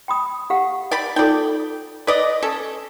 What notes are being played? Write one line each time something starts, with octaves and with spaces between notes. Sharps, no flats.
G5 B5 D#6
G4 F5 F#5
D5 G5 B5
D#4 F4 A4 D5 G5
B4 D5 D#5
C#4 A4